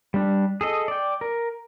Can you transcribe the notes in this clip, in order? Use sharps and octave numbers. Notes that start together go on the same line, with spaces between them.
G3 D4
G#4 A4 D#5
D5 G5
A#4